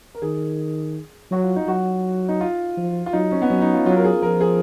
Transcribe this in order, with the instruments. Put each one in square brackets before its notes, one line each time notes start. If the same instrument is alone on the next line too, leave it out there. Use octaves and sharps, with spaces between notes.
[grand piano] A#4
[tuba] D#3 [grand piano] G#4
[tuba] F#3 [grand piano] F#4
[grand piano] F4
D#4
[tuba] F#3 [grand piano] F#4
[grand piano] D#4
F4
[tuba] F3
[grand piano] F4
[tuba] F#3 [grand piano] D#4
[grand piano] C#4
B3
[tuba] F#3 [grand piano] C#4
[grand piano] D#4
F4
[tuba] F#3 [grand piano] F4
[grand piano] A#4
G#4
[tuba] F3 [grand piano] A#4
[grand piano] G#4